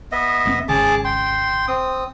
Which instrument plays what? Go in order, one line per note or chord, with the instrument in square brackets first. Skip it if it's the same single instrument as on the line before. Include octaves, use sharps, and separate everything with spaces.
[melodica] B3 D#5 E5
[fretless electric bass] F1 A#3 C4
[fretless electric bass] G#1 C#3 [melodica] G#4 A5 D6
[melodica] G5 C6
C4 D#6